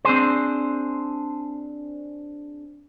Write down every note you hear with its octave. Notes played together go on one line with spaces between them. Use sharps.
C4 D4 G#4 C5